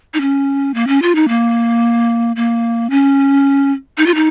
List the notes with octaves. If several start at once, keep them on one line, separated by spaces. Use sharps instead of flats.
D#4
C#4
A#3
C#4
F4
D#4
A#3
A#3
C#4
D#4
F4
D#4